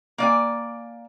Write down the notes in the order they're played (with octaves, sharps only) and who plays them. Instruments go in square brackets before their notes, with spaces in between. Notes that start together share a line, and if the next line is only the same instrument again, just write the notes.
[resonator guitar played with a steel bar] A#3 D5 G#5